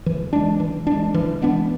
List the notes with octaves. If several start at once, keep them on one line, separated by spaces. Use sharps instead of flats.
E3
G#3 D4
E3
G#3 D4
E3
G#3 B3 D4